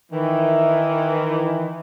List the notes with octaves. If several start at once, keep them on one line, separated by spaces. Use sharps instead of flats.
D#3 E3